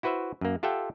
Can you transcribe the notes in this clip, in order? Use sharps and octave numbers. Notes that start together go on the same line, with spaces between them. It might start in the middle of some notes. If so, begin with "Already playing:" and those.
E4 F#4 B4 C5 E5
F#2 A#3
F4 G4 A4 E5 F#5 G5